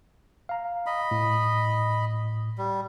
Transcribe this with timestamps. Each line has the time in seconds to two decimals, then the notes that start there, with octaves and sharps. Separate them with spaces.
0.49 F5 A#5
0.86 D#5 B5
1.11 A2
2.58 G3